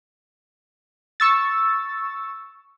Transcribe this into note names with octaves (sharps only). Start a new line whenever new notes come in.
C#6 E6 A6